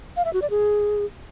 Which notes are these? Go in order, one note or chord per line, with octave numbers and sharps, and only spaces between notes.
F5
E5
F#4
D5
G#4